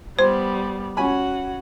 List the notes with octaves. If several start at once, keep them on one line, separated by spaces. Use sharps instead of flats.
G3 B3 C5 C6
C#4 F#4 F#5 G#5 B5